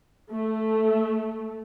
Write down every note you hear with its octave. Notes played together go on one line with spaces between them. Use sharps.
A3